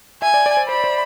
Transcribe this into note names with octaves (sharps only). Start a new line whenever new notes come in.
E5 G#5
D5
D5
C5
C5 B5
C5